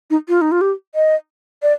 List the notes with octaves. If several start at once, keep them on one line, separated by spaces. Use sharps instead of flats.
D#4
F4
D#4
F4
G4
D#5
D5